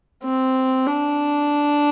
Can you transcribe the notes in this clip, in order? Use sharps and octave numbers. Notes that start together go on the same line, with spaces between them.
C4
D4